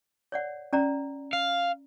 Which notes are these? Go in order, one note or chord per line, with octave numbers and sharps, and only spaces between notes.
C#5 D5 F#5
C#4 D5 A#5
F5